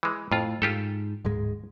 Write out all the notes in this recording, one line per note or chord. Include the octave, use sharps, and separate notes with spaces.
E3 G#3
F2 A2 F4
G#2 F4 G4 A4
D1 G#2 G#3